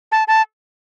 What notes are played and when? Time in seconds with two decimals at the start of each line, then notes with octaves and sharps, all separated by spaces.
0.12 A5
0.28 A5